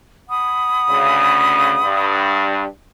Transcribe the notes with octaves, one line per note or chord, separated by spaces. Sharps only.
F#5 B5 D#6
D2 C#3
G2